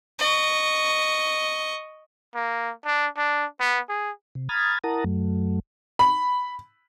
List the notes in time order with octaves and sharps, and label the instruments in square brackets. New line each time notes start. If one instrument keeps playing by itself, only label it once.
[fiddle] D#5 C#6
[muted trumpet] A#3
D4
D4
B3
G#4
[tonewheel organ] C3
A#5 B5 D#6 F6 G#6 A6
E4 A#4 F#5 A5 A#5 D#6
F#2 F#3 A3
[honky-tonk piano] B5